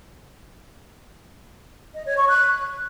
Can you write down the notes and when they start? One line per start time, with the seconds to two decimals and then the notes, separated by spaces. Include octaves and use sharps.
1.94 D#5
2.06 C#5
2.17 C#6
2.29 F#6